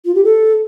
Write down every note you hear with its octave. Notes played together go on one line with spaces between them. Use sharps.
F4
G4
A4